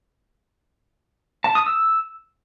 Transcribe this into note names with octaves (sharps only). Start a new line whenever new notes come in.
A5
D#6
E6